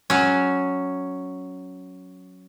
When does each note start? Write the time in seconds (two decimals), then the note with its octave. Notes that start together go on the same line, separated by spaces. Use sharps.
0.10 F#3 C#4